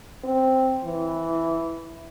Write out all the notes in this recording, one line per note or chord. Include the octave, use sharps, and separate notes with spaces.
C4
E3